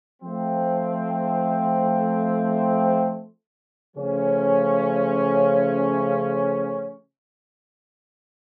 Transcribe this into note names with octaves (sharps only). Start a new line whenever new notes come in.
F3 A3 C4
C#3 F3 A3 C#4